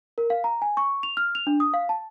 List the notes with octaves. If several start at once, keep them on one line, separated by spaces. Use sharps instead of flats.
A#4
F5
A#5
G#5
C#6
F7
F6
F7
D4
D#6
F5
A5